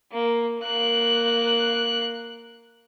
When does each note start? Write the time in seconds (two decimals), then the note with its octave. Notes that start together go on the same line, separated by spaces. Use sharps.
0.12 A#3
0.60 A#3 F#6